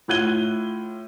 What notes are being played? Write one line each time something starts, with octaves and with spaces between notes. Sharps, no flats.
A2 F4 F#6 G#6 D#7 G7